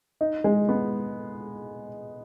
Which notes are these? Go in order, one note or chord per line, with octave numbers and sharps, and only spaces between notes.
D#4
G#3
B3